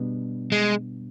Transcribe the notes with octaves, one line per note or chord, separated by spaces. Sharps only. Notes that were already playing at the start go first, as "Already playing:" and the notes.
Already playing: B2 G3 B3 D4
G#3